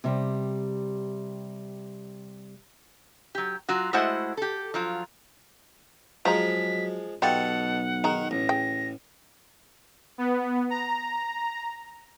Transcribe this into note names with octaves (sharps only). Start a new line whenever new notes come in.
C3 G3
F#3 G4
F#3 F4 F#4
G#3 A3 E4 F#4 C5 F#5
G4 A4
F3 F#3 F4
F3 F#3 G#3 F4 C5 A#5 B6
B1 B2 G3 F4 A4 F#5 G5
D#3 G#4 A#5
A1 A#6
G#4 G5
B3
A#5